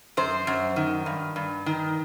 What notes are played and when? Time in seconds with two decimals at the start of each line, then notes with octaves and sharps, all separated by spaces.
0.17 F#2 C5
0.47 F#2
0.76 D#3
1.06 G2
1.36 G2
1.66 D#3